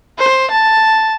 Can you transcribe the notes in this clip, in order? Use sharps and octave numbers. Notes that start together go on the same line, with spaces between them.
C5
A5